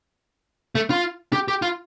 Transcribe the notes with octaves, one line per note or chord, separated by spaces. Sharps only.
A3
F4
G4
G4
F4